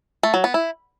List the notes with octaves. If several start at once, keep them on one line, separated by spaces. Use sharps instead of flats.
A3
F#3
B3
E4